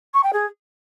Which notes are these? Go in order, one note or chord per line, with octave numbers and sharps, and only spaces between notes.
C#6
G5
G#4